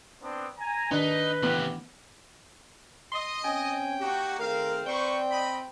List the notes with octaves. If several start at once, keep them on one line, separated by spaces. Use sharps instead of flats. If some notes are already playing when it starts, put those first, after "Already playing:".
B3 C4 D4
G#5 A#5
D#3 D4 D#4 B4
C#3 E3 A3 B3 G4
D#5 C6
C4 C#4 G5 G#5
A#3 D#4 F#4 G4
D#3 A3 C4 G#4 A#4 F5
C4 B4 C5 D5 G5 C#6
D#5 B5